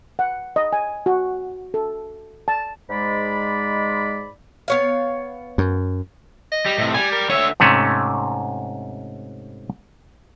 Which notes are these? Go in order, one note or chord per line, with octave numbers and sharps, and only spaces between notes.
F#5
D#5
G#5
F#4
A4
A5
G#2 G#3 D5 B5
B3 C#5 F5
F#2
D#5
G3
A2 C3
G3 G#5
A#4
D3 C#5 E5
G#2 C3 A3 C#4